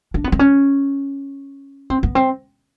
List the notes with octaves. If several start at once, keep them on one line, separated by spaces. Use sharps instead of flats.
D4
B3
C4
C#4
C4
B3
C4